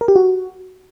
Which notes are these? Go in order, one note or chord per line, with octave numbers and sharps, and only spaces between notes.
A#4
G4
F#4